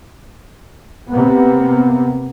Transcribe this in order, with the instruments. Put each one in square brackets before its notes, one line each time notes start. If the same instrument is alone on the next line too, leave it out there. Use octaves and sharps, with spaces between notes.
[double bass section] C3 A#3 B3